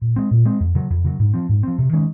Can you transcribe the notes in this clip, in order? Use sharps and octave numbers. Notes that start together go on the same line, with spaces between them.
A#2
G#3 C4
A#2
G#3 C4
F2
C#3 F#3
F2
C#3 F#3
G#2
F3 C4
G#2
F3 C4
C3
D#3 G#3 C#4